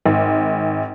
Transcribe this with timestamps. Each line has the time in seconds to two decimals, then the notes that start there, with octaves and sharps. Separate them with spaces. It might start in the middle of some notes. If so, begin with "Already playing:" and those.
0.05 G#1